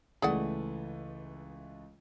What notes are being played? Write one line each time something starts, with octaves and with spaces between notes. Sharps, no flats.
C#2 E3 A3 G#4 D5 F#5